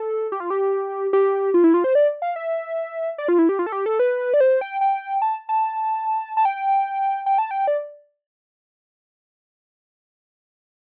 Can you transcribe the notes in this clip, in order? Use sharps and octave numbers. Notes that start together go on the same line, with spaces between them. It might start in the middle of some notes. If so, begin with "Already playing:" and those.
Already playing: A4
G4
F4
G4
G4
F4
E4
F4
C5
D5
F5
E5
D5
F4
E4
G4
F4
A4
G4
A4
B4
D5
C5
G5
G5
A5
A5
A5
G5
G5
A5
G5
D5